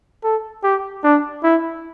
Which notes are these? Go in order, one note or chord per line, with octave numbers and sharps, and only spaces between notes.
A4
G4
D4
E4